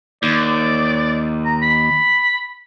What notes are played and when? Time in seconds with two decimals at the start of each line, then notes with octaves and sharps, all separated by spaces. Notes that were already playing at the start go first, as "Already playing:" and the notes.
0.23 D#2 D5
1.45 A#5
1.62 B5